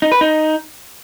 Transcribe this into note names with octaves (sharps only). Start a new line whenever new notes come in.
D#4
B4
D#4